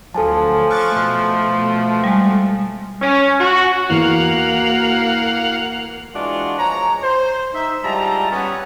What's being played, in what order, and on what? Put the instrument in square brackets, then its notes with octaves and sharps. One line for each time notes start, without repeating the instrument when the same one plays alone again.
[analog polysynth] D2 F#3 [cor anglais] F3 [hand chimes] A4 G#5 A5
[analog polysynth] C#6 D6 A6 [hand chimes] F6 F#6
[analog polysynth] B2 A3
[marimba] G3 G#3
[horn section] C#4
F#4
[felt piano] E2 [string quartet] A#3 [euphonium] F#4 [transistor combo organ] F5 F#5
[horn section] E3 G#3 D4 F4 F#4
F3 G#3 C#5 A#5
C5
D#4 E5
G3 G#3 E4 F4 A5 A#5
G3 B3 C#4